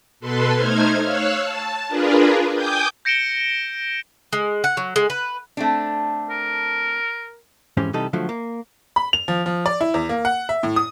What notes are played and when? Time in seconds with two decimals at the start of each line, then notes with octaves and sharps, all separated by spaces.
0.20 B2 A4 B4 C6
0.54 A3 D#4 C5 F6 G#6
1.03 C#5 F5 E6 F#6
1.41 A5
1.88 D4 F4 G#4 A#4 B4
2.54 G5 G#5 D6 D#6 G6
3.05 G6 A#6 C#7 D7 E7 G7
4.33 G#3
4.64 F#5
4.77 F#3
4.96 G#3
5.10 B4
5.57 A3 C4 D4
6.30 A#4
7.77 F2 G#2 E3 C#4 G4 C5
7.93 C3 E3 G3 D#4 A4
8.13 D3 F3 F#3 A3
8.29 A#3
8.96 B5
9.13 F7
9.28 F3
9.46 F3
9.66 D5
9.81 E4
9.94 E2
10.09 A#3
10.25 F#5
10.49 E5
10.63 A2
10.76 D#6